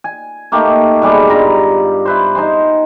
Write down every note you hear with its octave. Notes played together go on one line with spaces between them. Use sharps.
G#5
A3 A#3 D#4 G4
B2 G3 G#3 G4
G2 F4 A#5 B5
E4 B4 C5
D#4 C5 G#5 C6